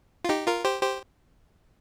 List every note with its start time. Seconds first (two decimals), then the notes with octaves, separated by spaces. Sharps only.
0.25 F4
0.29 D#4 G4
0.47 F4 A#4
0.64 G4 C5
0.82 G4 C5